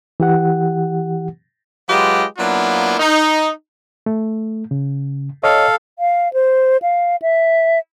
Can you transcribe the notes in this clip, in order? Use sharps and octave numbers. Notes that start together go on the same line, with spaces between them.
E3 G4 F#5
F#3 G#3 F4 G4 B4 D#5
F#3 A#3 B3 D4 E4 F4
D#4
A3
C#3
A4 C#5 D#5 F5
F5
C5
F5
E5